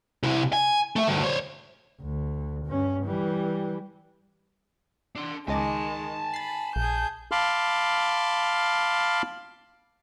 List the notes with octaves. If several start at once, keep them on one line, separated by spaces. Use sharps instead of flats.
C3 E4
G#5
A3 E5
D2 G2
C5 C#5
D2
G2 C#4
E3 G3
D4 C6
C#2 D#3 G#3 D#5 G#5 A5 D6
B5 A6 C7
A#1 G#4 G6
F5 A5 B5 C6 D6 F6